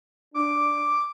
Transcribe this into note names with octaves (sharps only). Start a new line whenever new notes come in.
D4 D6